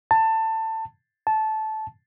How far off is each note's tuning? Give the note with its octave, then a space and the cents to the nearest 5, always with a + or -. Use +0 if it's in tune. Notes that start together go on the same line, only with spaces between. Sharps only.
A5 +20
A5 -15